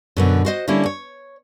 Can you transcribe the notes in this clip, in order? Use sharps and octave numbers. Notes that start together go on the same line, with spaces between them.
F#2 B2 D3
F#4 C5 D#5
D3 G3 A#3 C#4 E4
C#5